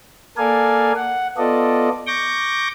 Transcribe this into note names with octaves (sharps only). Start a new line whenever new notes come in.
A#3 A4 A#4 D5 F5 G#5
F#5
B3 F4 A4 D5 D#5
C#6 D6 G6 A#6